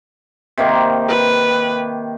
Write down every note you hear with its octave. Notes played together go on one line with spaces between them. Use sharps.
C3 D#3 A#3
B4